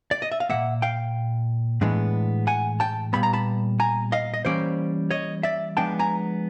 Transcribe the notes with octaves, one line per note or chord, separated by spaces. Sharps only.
D5
D#5
E5
F5
A#2 F3 A#3 E5 F#5
F5 G5
A2 E3 G#3 B3 D4
F#5 G#5
G5 A5
A#2 G3 B3 B5
A#5
A5 B5
G#5 A#5
D#5 F5
D#5
E3 G3 A#3 C#4 C5 D5
C#5 D#5
D5 E5
F3 G#3 B3 D4 G5 A5
G#5 A#5